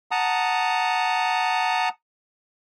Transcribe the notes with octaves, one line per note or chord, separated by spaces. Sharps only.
F#5 A5 A#5 D#6